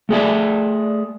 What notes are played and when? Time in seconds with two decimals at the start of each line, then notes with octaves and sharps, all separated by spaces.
0.09 A3 G#4 D5 E5